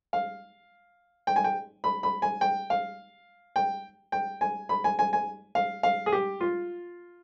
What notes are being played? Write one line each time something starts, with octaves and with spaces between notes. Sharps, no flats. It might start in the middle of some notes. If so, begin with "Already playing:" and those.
F5
G5
G#5
G5
B5
B5
G#5
G5
F5
G5
G5
G#5
B5
G#5
G#5
G#5
F5
F5
G#4
G4
F4